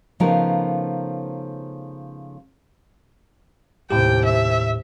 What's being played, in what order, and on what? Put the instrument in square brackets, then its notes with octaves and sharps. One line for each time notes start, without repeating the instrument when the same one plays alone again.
[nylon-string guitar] C#3 F3 A3 B3 D#4 A#4
[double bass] D#2 C3 [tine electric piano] A2 G4 [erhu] G5
[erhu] E5